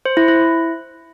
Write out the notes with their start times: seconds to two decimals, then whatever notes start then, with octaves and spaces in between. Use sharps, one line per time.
0.06 C5
0.17 E4
0.28 E4